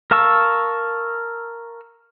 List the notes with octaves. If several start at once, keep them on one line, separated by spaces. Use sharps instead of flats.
A#4 F5 A5 C#6 E6